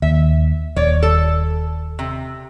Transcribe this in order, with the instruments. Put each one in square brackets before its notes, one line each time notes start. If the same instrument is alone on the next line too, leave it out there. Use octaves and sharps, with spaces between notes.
[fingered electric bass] D#2 [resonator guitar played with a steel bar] E5
[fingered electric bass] D#1 [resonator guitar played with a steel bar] C#5 D5
[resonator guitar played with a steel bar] A4
C3